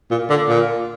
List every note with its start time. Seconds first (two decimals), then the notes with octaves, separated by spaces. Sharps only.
0.11 A#2
0.30 D3
0.48 A#2